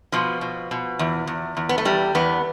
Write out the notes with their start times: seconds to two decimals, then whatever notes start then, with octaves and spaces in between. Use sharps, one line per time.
0.12 B2 F3
0.41 B2
0.71 B2
0.99 E2
1.27 E2
1.57 E2
1.69 B3
1.78 A3
1.85 E2 G3
2.15 E2 B3